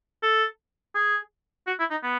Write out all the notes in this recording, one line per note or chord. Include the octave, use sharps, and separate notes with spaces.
A4
G#4
F#4
E4
D#4
B3